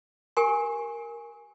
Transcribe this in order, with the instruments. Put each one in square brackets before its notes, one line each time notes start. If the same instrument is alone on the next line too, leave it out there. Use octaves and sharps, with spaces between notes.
[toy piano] G4 A#4 G#5 C#6